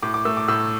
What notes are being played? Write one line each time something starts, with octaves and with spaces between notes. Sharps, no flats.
A2 D6
D6
A3 E6
D6
A2 E6